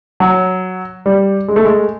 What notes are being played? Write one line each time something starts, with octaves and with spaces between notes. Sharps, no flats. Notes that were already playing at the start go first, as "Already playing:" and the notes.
F#3
G3
G#3
A3
G#3